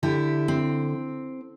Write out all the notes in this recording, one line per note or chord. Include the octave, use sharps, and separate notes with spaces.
D3 E4 G4
C4